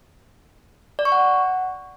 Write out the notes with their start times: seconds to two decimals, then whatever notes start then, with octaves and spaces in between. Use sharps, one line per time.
0.99 D5
1.05 C#6
1.12 F#5